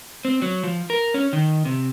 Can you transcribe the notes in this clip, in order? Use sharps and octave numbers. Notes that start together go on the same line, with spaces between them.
C4
F#3
F3
A#4
C#4
D#3
C3